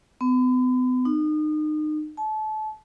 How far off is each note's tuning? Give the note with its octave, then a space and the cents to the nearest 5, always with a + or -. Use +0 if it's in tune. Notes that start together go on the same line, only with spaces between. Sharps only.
B3 +40
D#4 -30
A5 -30